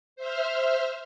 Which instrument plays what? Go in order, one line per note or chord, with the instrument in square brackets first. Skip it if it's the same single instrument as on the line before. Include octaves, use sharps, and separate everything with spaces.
[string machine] C5 E5 F6